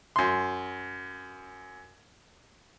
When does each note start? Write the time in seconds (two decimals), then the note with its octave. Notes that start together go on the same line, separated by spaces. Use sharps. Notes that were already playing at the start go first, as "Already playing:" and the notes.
0.16 F#2 C6